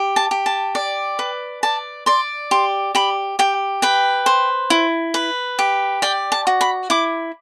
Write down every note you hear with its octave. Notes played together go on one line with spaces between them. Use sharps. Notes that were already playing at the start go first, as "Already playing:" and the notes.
Already playing: G4
A5
G4
A5
D5
B4
D5 A5
D5 C6
G4 C6
G4 B5
G4 G5
B4 G5
C5
E4
B4
G4
D5 G5
A5
F#4
B5
E4 D6